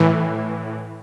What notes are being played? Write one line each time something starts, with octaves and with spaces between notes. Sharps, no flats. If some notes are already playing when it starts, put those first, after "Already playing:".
Already playing: A2 E3